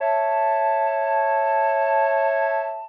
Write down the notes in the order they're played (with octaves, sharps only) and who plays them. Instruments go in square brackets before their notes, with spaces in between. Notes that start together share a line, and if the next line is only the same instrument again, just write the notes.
[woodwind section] C#5 E5 A5